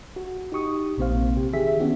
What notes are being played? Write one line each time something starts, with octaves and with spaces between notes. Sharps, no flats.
F#4
D#4 G4 C#6 D#6
A#1 C3 A#3 C4 C5 F5
G4
D#3 G4 G#4 E5 B6
B3 C#4 D4 F#4 G4